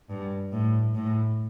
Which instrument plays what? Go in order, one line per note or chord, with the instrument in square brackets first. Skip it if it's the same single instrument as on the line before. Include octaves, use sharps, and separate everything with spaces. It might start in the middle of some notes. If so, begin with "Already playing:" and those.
[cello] G2
A2
A2